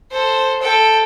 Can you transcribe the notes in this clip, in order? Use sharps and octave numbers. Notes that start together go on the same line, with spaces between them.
A4 C5
A4 G5